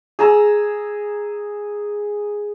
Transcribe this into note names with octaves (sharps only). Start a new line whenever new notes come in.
G#4 A#5 E6